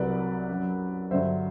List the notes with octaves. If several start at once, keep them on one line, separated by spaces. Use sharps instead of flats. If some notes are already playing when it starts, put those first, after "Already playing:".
Already playing: C2 C3 F#3 B4 D5
F#2 F#3
G2 D3 F#3 C5 E5